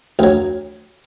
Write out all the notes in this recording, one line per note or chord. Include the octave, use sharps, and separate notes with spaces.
D2 F#3